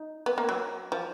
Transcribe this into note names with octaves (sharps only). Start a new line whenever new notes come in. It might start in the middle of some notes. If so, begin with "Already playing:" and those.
Already playing: D#4
B3
A#3
F#3
F3